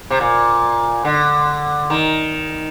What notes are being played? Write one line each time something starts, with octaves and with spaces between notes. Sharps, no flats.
C3
A#2
D3
D#3